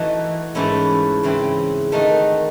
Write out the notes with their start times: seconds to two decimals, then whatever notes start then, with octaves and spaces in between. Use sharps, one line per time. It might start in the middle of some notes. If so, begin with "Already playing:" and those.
Already playing: E3 A3 D#4 F#4
0.55 G#2 E3 A3 C#4 E4
1.23 C#3 E3 C4 E4
1.92 D#3 A3 D#4 F#4